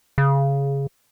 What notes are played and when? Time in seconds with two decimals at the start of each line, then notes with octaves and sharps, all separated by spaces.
0.18 C#3